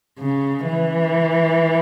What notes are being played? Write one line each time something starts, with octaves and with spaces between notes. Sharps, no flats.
C#3
E3